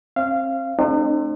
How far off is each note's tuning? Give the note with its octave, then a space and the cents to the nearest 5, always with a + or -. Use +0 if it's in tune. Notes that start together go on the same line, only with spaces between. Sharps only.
C4 +35 F5 -20
A3 +0 C4 +35 D#4 -45